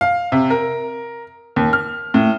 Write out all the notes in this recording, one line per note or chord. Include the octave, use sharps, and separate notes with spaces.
F5
C3
A#4
D#2
F6
A2